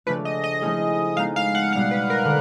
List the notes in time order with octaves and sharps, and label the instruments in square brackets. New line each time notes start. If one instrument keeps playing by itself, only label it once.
[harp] C#3 F3 A3 D4 F4 [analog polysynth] B4
[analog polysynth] D#5
D#5
[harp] F3 A3 C#4 E4 G#4
[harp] G#3 B3 D#4 [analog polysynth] F5
[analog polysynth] F5
F#5
[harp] B2 G3 B3 [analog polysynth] F5
[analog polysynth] B4
A#4
[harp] D3